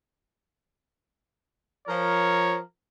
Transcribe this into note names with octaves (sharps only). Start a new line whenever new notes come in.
F3 A#4 C#5